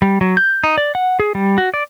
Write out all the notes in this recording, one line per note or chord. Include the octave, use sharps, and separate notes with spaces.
G3
F#3
G6
D#4
D5
F#5
G#4
G3
F#4
D5